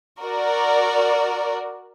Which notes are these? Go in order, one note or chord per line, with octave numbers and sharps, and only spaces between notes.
F#4 A#4 D5